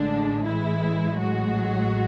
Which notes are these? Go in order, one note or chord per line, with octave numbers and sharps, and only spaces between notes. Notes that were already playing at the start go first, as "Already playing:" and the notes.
Already playing: A1 A2 D3 G#3 D4
E3 E4
F#3 F#4